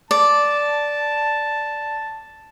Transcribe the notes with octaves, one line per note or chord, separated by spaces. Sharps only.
D5 A5